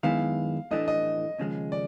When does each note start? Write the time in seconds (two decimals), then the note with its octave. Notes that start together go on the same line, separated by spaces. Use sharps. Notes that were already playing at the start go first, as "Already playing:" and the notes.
0.03 F#2 D#3 G#3 B3 E4 F5
0.71 A2 E3 A3 D4 D#5
0.88 D#5
1.39 D#2 C#3 F3 G#3
1.72 D5